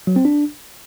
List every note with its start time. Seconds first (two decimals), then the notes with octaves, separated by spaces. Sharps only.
0.07 F#3
0.16 C4
0.25 D4